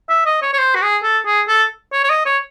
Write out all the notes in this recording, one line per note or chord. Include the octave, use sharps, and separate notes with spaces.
E5
D#5
C#5
C#5
C5
F#4
G#4
A4
G#4
A4
C#5
C#5
D#5
C#5